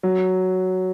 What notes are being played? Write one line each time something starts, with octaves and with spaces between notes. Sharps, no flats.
F#3